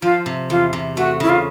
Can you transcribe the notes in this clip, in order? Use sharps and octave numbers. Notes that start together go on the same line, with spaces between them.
F3 F4
C3
E2 F4
C3
A3 F#4
C#3 E4
F4